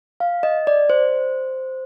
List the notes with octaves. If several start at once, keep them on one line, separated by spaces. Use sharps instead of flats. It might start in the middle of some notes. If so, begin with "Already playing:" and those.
F5
D#5
D5
C5